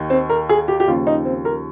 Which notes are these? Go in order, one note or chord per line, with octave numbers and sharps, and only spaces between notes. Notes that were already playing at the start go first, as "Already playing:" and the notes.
Already playing: D#2 D#3
C4
A#4
G#4
G4
G4
D#2 C#3 F3 F4
D#4
C4
A#4